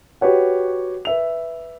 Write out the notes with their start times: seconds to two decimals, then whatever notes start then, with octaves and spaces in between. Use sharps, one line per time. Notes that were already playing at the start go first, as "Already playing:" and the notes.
0.21 F#4 G4 B4 C#5 F#5
1.05 B4 E5 F7